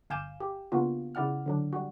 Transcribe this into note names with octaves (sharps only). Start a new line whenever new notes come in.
G1 F5 G#5 D6 G6 E7
G4
C#3 A#3 B3 D4 F4 F#4
C#3 E4 D5 F#5 F6
D3 F#3 D4
G3 F#4